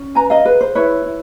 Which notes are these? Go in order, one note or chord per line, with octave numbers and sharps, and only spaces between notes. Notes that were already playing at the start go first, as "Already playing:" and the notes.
Already playing: C#4
B4 G#5 A#5
D#5 F5
G#4 B4
C5
E4 B4 C#5
E4